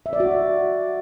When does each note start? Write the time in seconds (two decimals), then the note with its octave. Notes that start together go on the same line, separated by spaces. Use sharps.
0.06 E5
0.13 D5
0.20 F#4